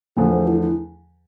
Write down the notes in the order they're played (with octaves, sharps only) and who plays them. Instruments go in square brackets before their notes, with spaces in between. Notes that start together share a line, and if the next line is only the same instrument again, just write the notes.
[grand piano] E2 D3 F3 A3 [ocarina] A4
[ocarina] C5
E4
E4